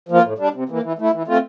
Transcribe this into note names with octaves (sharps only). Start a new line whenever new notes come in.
F3 A#3 F4
A2
G3 D4
C3
E3 A#3
E3
A3 E4
E3
A3 C4 F4